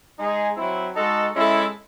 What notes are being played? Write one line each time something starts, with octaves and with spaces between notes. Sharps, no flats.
G#3 D#4 G#4
F#3 C4 E4
G#3 D#4 F#4 A4
G#3 C#4 E4 A4